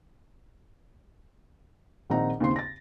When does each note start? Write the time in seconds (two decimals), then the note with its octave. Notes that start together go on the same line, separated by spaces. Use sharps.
2.10 A#1 D#3 C4 D#4 F#5 A#5
2.40 D#2 C#3 C4 C6
2.56 A6 A#6